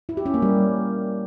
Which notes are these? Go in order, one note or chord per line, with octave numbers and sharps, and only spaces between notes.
E4
G4
C#4
A#3
G3